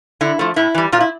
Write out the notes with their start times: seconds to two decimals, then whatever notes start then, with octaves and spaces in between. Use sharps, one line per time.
0.21 D3 E4
0.39 F3 A3
0.56 A2 E4
0.75 E3 G3
0.92 A#2 F4
1.00 E4